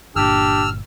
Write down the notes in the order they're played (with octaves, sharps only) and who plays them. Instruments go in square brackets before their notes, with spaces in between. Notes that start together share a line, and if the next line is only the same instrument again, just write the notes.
[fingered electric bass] G1 A#2 [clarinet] D4 [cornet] G4 [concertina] E6 F6